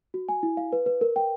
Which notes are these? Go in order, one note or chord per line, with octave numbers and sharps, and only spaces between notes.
F#4
G#5
E4
F5
B4
B4
A#4
G5